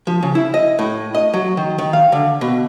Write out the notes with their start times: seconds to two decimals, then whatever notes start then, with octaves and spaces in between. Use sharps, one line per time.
0.07 F3
0.23 C#3
0.35 E4
0.54 D#5
0.79 A2
1.15 D#5
1.34 F#3
1.57 D#3
1.78 D#3
1.93 F5
2.12 D3
2.41 B2